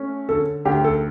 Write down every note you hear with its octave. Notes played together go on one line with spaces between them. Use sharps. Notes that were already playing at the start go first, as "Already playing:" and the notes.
Already playing: A3 C#4
D3 A4
D2 G4
A4